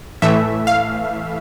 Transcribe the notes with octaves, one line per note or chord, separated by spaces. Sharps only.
A2 E3 A3 E5
F5